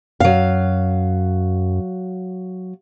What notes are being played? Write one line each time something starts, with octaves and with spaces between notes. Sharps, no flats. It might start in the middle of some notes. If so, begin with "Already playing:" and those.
F#2 F#3 F5